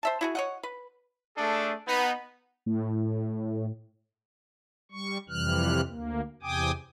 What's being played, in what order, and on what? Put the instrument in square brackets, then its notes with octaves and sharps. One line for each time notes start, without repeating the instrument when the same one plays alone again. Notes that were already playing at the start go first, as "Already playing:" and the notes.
[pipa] C5 E5 A5
E4 F#4 G#4
C#5 D#5 F#5
B4
[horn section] A3 D4 G#4 A4
B3 D#4
[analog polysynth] A2
[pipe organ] G3 C#6
F2 C3 E3 G3 F6 F#6
D2 A#3
E2 C3 G5 G#5 D6 D#6